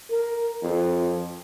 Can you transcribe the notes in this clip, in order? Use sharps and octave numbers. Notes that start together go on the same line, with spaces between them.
A#4
F2